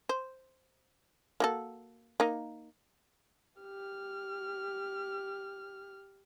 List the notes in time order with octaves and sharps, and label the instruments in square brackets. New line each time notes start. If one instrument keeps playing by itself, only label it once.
[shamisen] C5
A#3 F#4 A4
A#3 D#4
[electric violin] G4 F6